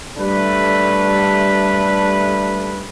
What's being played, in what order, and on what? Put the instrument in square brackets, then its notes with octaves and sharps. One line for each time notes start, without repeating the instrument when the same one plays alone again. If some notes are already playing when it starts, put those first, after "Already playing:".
[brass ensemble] G3 A3 D4 B4